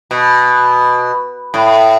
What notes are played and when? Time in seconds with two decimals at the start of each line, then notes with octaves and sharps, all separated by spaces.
0.11 B2
1.54 A2